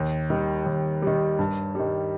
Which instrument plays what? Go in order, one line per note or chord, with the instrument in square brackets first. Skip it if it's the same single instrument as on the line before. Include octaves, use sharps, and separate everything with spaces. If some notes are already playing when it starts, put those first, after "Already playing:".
Already playing: [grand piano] D#2
D#3 G3
D#2
D#3 G3
G2
D#3 G3